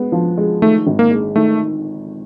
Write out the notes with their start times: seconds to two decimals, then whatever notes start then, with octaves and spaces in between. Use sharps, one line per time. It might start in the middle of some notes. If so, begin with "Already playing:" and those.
Already playing: G#3 B3
0.12 F3
0.37 G#3
0.62 D#3 A3
0.87 G#1
0.99 A#3
1.11 G#3
1.36 D#3 A3